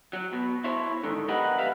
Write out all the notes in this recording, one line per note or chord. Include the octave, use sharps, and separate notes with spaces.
F#3
B2
E4 C5 C#5
G#2 D3 D#3
B1 G4 A#4 B4 D#5 F#5
B4 E5 F5